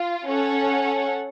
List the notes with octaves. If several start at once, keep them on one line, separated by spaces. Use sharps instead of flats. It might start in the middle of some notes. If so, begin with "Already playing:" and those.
Already playing: F4
C#4 A4 C#5 F#5